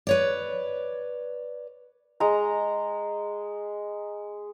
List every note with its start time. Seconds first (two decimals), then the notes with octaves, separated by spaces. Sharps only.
0.07 B4 C#5 D5
2.20 G#3 A#5